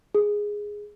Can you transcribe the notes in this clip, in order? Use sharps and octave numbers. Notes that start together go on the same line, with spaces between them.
G#4